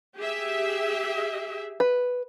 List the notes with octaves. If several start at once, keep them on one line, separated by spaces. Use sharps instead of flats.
G4 G#4 E5
B4